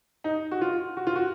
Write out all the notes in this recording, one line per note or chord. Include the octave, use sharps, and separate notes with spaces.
D#4
F#4
F4
F#4
F4
F#4